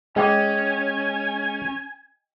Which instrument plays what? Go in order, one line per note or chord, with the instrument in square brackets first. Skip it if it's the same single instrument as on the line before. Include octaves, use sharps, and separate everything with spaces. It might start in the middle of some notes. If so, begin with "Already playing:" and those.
[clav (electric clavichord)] G#3 [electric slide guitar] C#4 [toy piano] D#5 G5 D6 [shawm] G#5